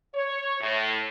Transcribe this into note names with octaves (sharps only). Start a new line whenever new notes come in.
C#5
A2